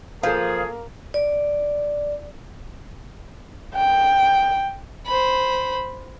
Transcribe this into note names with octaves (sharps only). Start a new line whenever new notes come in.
F3 A#3 F4 G#4 A4 F5
D5
G5
C5 B5